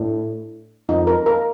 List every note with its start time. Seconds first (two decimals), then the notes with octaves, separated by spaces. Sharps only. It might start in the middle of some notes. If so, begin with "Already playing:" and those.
Already playing: A2 D4
0.89 F2 D#4
1.07 A#4
1.26 A#4